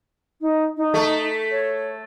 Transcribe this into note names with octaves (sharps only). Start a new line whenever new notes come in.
D#4
D#4
A3
C#5